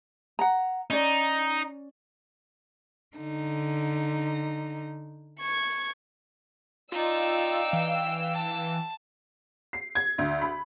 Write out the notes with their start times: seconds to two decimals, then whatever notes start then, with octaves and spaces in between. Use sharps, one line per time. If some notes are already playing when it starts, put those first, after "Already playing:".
0.39 F#5 A#5
0.90 C#4 D#4 D5
3.18 D3 D#4
5.38 C#6 G#6
6.92 D#4 F4 D5 F5 G5 E6
7.73 E3
8.33 A5
9.73 C7
9.95 G#6
10.18 D2
10.41 B5